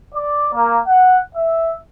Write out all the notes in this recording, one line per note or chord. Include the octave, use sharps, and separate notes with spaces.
D5
A#3
F#5
E5